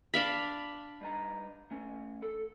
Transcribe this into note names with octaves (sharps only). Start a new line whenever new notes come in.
D4 F5 B5
G2 D#4 A#5
A3 C#4
A4